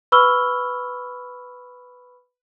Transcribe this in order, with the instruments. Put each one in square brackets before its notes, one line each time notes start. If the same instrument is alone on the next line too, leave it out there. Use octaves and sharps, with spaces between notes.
[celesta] B4 B5 C#6 E6 F6 G7